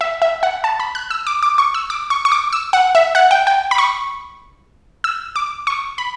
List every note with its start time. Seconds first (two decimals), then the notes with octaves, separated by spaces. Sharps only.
0.01 E5
0.22 E5
0.43 F#5
0.64 A5
0.80 B5
0.95 F#6
1.10 E6
1.27 D6
1.43 D6
1.58 C#6
1.74 E6
1.90 D6
2.10 C#6
2.25 C#6
2.32 D6
2.52 E6
2.73 F#5
2.95 E5
3.15 F#5
3.31 G5
3.47 G5
3.71 B5
3.78 C#6
5.04 E6
5.36 D6
5.67 C#6
5.98 B5